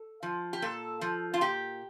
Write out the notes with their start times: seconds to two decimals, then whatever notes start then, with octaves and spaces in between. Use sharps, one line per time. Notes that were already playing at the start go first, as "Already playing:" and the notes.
Already playing: A4
0.23 F3
0.53 G4
0.62 A#2 A4
1.01 F3
1.34 F4
1.41 A#2 G4